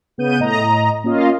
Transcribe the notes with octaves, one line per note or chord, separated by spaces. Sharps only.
C#3 B3 G6 D#7
A2 D#5 A#5
A#3 C#4 F4 D#5 F5